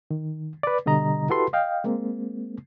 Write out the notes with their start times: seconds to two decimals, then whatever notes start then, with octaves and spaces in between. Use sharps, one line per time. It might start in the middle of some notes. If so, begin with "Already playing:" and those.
0.11 D#3
0.63 B4 D5
0.86 B2 D3 G3 D#5 A#5
1.29 E4 F#4 G4 A4 B4 C6
1.53 D#5 F5 G5
1.84 G#3 A#3 C4